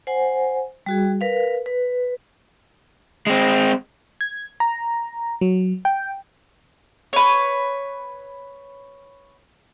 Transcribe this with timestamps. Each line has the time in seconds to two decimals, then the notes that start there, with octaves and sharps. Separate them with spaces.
0.07 C5 F#5 G#5
0.86 G3 F#4 G#4
1.21 A#4 B4 F5
1.66 B4
3.27 G#3 C4
4.21 G#6
4.60 A#5
5.41 F#3
5.85 G5
7.13 B4 C#5